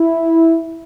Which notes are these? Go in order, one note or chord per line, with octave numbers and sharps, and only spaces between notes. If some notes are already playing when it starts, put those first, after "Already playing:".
Already playing: E4